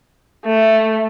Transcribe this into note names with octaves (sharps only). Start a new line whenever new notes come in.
A3